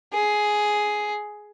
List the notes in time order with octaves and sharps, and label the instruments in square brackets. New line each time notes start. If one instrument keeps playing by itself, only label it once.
[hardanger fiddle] G#4